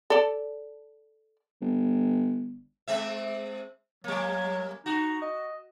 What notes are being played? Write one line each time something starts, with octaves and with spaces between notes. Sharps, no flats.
A4 D5
G1
G#3 C4 E5
F#3 G3 A#3
D#4 F#4
D#5